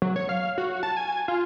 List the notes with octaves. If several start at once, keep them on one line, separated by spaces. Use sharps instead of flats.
F#3
C#5
F5
F#4
A5
G#5
F4